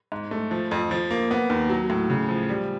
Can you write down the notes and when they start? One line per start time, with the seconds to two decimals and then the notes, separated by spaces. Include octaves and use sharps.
0.12 G#2
0.31 A3
0.51 F3
0.71 F2
0.91 F3
1.11 A#3
1.31 B3
1.50 D#2
1.70 F#3
1.90 A2
2.10 C#3
2.29 F3
2.49 G3